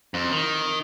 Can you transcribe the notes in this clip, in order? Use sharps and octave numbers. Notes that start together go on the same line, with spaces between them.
F2
D#3